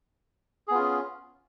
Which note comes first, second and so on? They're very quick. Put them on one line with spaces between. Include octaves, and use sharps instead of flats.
G#4 B3 F4 C#4